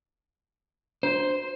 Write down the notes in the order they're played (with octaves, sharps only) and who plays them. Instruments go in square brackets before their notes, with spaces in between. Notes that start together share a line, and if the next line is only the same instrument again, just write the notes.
[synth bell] D4 [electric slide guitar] C5